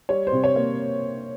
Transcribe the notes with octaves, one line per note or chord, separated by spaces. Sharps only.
G3 C#5
C5
C3
C#5
A#3